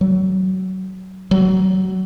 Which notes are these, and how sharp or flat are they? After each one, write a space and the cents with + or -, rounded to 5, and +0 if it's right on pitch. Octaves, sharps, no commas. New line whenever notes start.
F#3 +25
F#3 +20